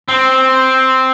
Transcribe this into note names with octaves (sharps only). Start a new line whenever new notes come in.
C4